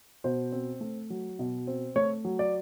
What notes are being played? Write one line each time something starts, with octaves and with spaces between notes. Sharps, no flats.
B2 C5
C4
A3
F#3
B2
C4
A3 C#5
F#3
D5